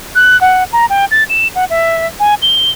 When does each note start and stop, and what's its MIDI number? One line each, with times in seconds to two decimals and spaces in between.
0.15 0.39 90
0.41 0.64 78
0.73 0.86 82
0.90 1.05 79
1.11 1.24 93
1.29 1.48 100
1.55 1.65 78
1.70 2.07 76
2.20 2.35 80
2.42 2.70 103